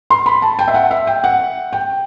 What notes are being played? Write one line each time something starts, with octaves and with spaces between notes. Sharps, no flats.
C6
B5
A5
G5
E5
F#5
E5
G5
F#5
G5